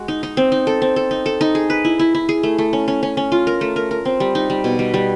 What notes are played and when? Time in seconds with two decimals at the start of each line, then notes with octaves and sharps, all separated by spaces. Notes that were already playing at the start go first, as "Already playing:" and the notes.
Already playing: G#3 F#4
0.08 D#4
0.23 D#4
0.37 C4
0.52 D#4
0.67 A4
0.82 C4
0.96 A4
1.11 D#4
1.26 A4
1.41 D#4
1.55 G#4
1.70 B4
1.85 E4
1.99 E4
2.15 E4
2.29 G#4
2.43 A3
2.58 A3
2.73 C#4
2.88 C#4
3.03 C#4
3.17 C#4
3.32 F4
3.47 A#4
3.61 A3
3.76 A#4
3.91 A#4
4.05 C4
4.20 G3
4.35 D#4
4.50 G3
4.64 B2
4.79 G3
4.94 G3